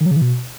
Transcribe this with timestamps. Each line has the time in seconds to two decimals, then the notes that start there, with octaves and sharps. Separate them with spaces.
0.01 D#3
0.06 F#3
0.11 C#3
0.16 E3
0.22 B2